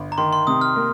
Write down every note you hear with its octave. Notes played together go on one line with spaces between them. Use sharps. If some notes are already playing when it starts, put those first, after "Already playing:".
Already playing: G1
A#5
D#3 C6
C6
C3 D#6
F6
A#3